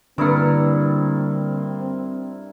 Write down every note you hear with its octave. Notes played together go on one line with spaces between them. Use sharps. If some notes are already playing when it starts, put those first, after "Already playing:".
G2 D3 A#3 C4 E4 A#4